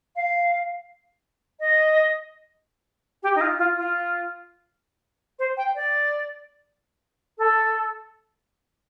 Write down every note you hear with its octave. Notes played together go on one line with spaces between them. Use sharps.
F5
D#5
G4
D#4
F4
F4
F4
C5
G5
D5
A4